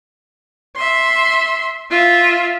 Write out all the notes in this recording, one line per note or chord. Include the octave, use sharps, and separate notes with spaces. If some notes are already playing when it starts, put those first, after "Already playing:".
E5 C6
F4 E5